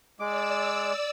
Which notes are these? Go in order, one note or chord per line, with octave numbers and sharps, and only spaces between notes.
G#3 D5 D6 E6